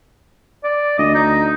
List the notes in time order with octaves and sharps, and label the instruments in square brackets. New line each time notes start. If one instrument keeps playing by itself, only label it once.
[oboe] D5
[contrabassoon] D2 [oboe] D#5
[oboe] D#4